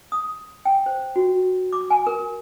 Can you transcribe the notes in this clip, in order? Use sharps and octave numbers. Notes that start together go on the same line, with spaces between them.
D#6
G5
C5
F#4
D6
G#5
A#4